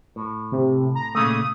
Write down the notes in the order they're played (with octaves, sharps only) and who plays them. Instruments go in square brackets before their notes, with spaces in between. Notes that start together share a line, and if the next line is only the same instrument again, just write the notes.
[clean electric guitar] A2
[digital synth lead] C3
A#5
[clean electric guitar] A#2 C#3 A3 [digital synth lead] D#6